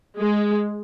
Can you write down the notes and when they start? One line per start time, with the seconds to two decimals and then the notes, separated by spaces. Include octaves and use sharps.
0.19 G#3